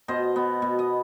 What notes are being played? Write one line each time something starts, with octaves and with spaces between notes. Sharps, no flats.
B2 C5 D#5
B3
B2
D#5